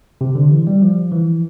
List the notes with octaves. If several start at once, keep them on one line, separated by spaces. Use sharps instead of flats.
C3
D3
E3
G3
F3
E3